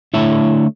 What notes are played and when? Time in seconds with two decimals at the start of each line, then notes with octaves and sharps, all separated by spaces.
0.14 D3 A3 E4 C#5 E5